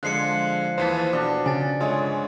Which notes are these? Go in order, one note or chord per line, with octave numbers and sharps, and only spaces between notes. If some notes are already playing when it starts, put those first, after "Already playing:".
D3 F3 G#3 F#6 C7 C#7
D#2 E3 C5 A5 B6
B2 D4
C#3 G#5 A6
G1 G#3 F4 C#5